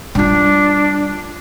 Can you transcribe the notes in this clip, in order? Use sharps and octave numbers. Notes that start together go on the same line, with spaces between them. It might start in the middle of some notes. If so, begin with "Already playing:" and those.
G3 D4 F4